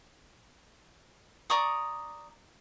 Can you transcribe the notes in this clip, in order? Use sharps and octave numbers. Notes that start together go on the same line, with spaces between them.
D5 A#5 C#6 D#6